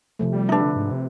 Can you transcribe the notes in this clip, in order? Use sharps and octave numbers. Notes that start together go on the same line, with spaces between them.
C3 F3 A3
G3
D4 D#4 B4 E5
D3
G#2
C3